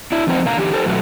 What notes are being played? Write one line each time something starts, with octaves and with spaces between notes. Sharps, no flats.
D4 E4
E2 F3 C4 D#4 C5 F#5
B2 D3 F5 A#5
E2 D3 G4
G4 A4 C5
F#2 B2 F#3 A3